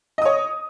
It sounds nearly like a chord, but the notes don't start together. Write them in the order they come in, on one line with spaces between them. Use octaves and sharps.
D#5 D#6 C#5